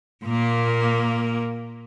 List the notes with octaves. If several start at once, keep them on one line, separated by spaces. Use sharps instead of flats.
A#2 A#3